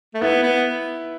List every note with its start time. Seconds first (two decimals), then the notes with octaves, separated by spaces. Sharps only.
0.14 A3
0.22 B3 E4
0.43 B3